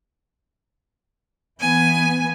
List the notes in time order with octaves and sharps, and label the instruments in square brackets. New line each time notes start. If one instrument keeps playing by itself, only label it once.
[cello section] E3 B3 [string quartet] G#5